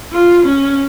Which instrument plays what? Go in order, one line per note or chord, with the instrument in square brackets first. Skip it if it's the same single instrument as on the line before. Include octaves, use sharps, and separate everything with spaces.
[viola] F4
C#4